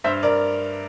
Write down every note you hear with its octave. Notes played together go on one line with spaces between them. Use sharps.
G2 C5 E5
A#4 D5